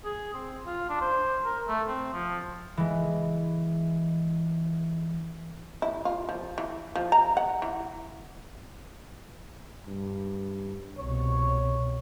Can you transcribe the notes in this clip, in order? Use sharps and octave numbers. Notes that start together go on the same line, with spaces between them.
G#4
C4
F4
D4
C5
A#4
A3
C4
F3
E3 G#3
E4
F4
F3
E3
F3
A#5
F#5
E3
G2
C2 B2 C#5